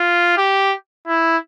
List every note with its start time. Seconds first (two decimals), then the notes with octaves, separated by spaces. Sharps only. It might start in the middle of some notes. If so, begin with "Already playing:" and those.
Already playing: F4
0.37 G4
1.07 E4